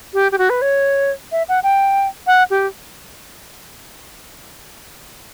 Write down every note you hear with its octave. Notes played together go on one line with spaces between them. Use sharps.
G4
G4
F#4
B4
C#5
E5
F#5
G5
F#5
G4